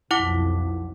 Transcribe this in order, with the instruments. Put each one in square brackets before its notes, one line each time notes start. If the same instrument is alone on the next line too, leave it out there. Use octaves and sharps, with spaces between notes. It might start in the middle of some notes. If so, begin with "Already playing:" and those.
[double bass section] B1 F2 [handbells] E4 F#5 D6